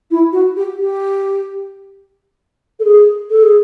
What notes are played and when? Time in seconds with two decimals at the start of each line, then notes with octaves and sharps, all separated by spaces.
0.11 E4
0.32 F#4
0.56 G4
0.79 G4
2.79 A4
2.84 G#4
3.30 A4
3.43 G#4